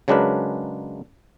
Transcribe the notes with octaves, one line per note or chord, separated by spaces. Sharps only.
C#3 F#3 G#3 D4 A#4 B4